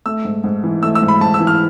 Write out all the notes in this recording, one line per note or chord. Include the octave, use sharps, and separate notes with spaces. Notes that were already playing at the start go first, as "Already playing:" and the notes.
A3 E6
G#2
G#2
E3
A3 E6
E6
G#2
B5
G#2 A5
E6
E3
F6